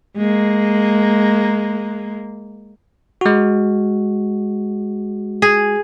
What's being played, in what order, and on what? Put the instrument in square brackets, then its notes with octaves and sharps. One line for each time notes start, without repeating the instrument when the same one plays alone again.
[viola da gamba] G#3 A#3
[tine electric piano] G#3 F#4
[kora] G#4